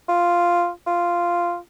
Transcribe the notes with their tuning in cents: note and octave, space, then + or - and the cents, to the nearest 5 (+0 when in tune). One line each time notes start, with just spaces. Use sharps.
F4 +0
F4 -5